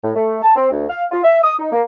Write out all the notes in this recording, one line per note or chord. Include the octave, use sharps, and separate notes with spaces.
A2
A3
A5
C4
D2
F5
F4
E5
D#6
D#4
A#3